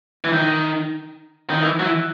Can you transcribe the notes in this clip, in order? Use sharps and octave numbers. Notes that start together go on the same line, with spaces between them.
E3
D#3
D#3
E3
F#3
E3